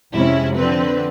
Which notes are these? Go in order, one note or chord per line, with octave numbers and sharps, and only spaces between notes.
F2 C3 G#3 C#4 E4
D3 F3 C4 B4